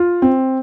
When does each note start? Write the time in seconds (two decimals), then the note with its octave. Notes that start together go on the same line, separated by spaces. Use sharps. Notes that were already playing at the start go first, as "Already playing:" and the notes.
Already playing: F4
0.22 C4